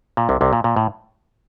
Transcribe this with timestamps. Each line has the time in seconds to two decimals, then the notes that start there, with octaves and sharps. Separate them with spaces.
0.17 A#2
0.29 C2 C3
0.41 C2 C3
0.53 A#2
0.64 A#2
0.76 A2